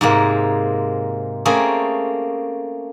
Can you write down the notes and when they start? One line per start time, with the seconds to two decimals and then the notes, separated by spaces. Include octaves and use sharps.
0.01 G#2 C3 G#3 A#3
1.45 A3 A#3 C4 C#4 G#4